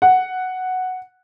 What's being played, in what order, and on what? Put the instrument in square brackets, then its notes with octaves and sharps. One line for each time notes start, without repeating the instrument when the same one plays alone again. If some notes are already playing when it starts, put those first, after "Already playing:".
[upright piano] F#5